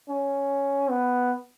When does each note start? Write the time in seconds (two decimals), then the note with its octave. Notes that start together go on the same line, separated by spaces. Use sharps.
0.09 C#4
0.90 B3